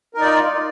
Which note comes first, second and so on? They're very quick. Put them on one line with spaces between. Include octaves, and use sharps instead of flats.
A#4 D#4 D5 F4